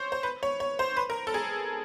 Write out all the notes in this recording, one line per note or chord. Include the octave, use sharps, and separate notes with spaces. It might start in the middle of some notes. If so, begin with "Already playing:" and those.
Already playing: C5 C#5
C5
B4
C#5
C#5
C5
B4
A#4
A4
G#4